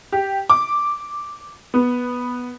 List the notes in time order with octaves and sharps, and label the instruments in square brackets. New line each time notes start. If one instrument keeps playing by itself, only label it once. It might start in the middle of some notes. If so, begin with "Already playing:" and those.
[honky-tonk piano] G4
D6
B3